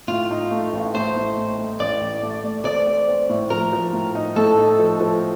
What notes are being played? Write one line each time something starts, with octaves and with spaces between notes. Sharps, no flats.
A2 F4
D#4
A3
A1
A3 C5
A2
A2
A3
A1 D5
A1
A3
A3
C4 D5
C4
C4
A2
F3 A#4
F3
A2
D#4
A2 A4
D#4
F3
F3